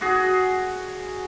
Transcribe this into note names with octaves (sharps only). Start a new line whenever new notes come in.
F#4 G#4